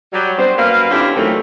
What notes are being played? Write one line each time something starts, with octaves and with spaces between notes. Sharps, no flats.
F#3 G3 C#5
B3 C4 D4 C5
F#2 A#3 A#4 B4 F5
D3 C4 C#4 E4 F4 G4
G#2 C3 D#3 E3 F#3 A3